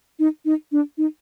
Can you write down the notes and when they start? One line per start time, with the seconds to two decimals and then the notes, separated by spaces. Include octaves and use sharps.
0.19 D#4
0.45 D#4
0.72 D4
0.98 D#4